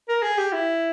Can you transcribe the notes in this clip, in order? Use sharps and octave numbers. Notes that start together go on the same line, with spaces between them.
A#4
G#4
G4
E4